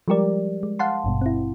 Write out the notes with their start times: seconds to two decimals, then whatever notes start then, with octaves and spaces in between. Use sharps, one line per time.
0.08 F3 G3 G#3 G4 A#4 D5
0.63 G#3
0.79 F5 F#5 A5 C6
1.04 G#1 G2 B2
1.21 C4 E4